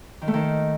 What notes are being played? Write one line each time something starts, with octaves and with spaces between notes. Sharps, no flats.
D#3
A3
D#3